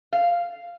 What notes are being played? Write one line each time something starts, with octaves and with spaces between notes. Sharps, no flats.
F5